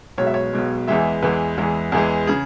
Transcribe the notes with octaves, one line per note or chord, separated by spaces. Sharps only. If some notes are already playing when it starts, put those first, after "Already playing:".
B1 B2 G#3 C#5
E5
C#5
B1 B2 G#3
E2 E3 G#3 E5
E2 E3 G#3 B4
E2 E3 G#3
E2 E3 G#3
C#3 G#4